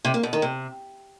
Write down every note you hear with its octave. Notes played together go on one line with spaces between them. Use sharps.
C3
A#3
B2
D#3
C3